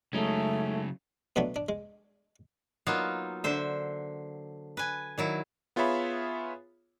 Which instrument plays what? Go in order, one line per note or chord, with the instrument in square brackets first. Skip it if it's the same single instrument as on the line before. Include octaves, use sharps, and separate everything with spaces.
[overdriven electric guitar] C#3 F#3 [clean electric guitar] G#3 C#4 D#4 [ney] A3
[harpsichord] B2 F#3 A3 B3 D4 F#4
D4
G#3
[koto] F#3 A#3 B3 D#4 F4
D3 C5 E5
B4 G#5
D#3 F#3 E4
[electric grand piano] B3 F4 G#4 C#5 E5 B5